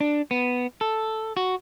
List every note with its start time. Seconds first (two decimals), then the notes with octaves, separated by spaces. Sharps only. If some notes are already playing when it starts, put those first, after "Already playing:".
0.01 D4
0.31 B3
0.81 A4
1.37 F#4